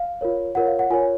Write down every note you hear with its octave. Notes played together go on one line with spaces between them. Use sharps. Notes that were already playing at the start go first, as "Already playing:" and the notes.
Already playing: F5
F4 A#4 C#5
F4 A#4 C#5 F#5
F5
F#5
F4 A#4 C#5 G#5